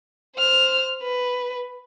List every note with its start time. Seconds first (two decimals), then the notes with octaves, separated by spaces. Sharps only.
0.36 C5 F6
1.02 B4